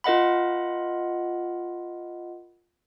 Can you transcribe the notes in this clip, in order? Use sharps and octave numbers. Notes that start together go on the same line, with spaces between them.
F4 A#4 D#5 F#5 B5